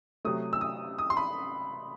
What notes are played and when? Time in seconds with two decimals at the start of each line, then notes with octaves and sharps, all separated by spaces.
0.25 C3 F#3 A3 D#6
0.53 E6
0.61 D#6
0.99 D#6
1.10 C6
1.17 B5